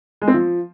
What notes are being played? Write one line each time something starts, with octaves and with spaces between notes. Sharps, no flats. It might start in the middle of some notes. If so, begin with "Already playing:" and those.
G#3
C4
F3